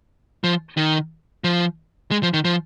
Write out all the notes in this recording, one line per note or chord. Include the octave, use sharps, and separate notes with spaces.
F3
D#3
F3
G#3
F3
D#3
F3